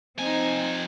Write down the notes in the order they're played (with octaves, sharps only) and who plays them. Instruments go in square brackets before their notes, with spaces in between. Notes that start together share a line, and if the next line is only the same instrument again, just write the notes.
[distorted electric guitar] F2 G#5 [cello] C4 D#4